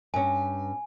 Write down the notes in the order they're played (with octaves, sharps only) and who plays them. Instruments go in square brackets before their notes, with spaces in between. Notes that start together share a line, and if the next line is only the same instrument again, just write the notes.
[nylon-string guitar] G2 C#4 [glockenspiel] G#5